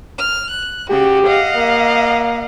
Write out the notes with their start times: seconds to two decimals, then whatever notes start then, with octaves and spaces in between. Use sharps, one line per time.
0.18 F6
0.51 F#6
0.90 C#3 F#4 G4
1.24 D#5 F5 F#5
1.56 A#3